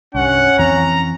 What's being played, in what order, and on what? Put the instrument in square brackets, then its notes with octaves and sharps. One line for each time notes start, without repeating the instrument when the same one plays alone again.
[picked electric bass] C2 G2 [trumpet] C#4 [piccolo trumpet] F#5
[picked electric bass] F2 E3 C4 [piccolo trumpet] A#5